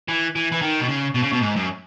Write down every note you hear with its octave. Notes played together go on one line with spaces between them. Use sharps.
E3
E3
E3
D#3
B2
C#3
B2
C#3
B2
G#2
F#2